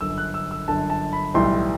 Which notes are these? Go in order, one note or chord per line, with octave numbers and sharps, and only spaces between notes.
G1 F#2 D3 E6
F#6
E6
E6
G1 F#2 D3 A5
A5
B5
B1 A2 E3 G3 C6